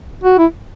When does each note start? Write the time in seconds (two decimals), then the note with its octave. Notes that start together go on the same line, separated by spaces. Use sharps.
0.24 F#4
0.38 E4